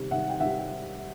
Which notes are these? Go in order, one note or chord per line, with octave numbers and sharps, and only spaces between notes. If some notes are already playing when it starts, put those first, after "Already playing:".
Already playing: C3 D#3 G3
C3 D#3 G3 E5 F#5
G5
C3 D#3 G3 E5 F#5